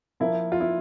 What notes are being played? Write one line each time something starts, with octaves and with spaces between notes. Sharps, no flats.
A#2 F3 A#3 E4
F4
E4